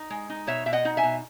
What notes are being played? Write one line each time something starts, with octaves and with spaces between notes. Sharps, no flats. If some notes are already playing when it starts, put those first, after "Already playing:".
Already playing: D#4
G#3
D#4
B2 C#5 E5
B2 E5
D#5 F#5
D#4
E5 G#5
B2